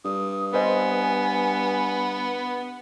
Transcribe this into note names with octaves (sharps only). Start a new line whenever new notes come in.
G2 D#6
B3 B4 C5 D#5 G#5